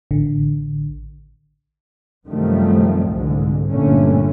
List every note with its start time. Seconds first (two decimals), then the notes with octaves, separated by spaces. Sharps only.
0.11 A1 D3
2.28 F#2 C3 D#3 F3 G3 A3
3.10 C2 G#2 D3
3.71 G1 G2 A#2 D3 A3 C#4